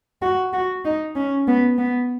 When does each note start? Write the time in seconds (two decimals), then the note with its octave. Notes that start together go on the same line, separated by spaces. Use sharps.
0.22 F#4
0.53 F#4
0.85 D#4
1.16 C#4
1.47 B3
1.78 B3